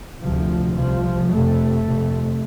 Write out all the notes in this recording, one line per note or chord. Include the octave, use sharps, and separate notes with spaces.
D2 C3 F3
C2 C3 F3
F2 C3 A3
F2 C3